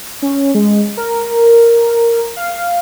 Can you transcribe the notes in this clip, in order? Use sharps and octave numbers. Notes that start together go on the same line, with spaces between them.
C#4
G#3
A#4
F5